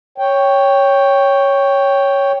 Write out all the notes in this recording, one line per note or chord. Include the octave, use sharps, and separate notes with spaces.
C#5 G5